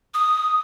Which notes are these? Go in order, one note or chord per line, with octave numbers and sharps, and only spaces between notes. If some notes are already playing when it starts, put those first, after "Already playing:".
D#6